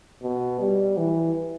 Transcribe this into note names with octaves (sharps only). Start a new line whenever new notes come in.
B2
G3
E3